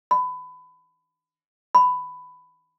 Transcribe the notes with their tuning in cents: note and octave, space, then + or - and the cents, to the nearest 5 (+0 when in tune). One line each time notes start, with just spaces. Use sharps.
B5 +25
B5 +15